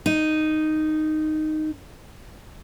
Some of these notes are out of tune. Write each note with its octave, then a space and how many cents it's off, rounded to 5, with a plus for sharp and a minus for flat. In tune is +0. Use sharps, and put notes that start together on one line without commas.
D#4 -5